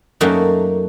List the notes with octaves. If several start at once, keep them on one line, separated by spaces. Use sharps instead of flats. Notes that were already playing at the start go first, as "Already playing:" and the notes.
F#2 F#3 A3 A#3 D#4 F#4